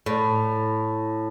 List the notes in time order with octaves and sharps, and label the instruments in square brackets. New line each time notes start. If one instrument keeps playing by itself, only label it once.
[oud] A2